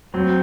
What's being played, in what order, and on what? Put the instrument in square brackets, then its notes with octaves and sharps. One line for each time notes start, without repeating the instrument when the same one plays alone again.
[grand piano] F#3 [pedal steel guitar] C4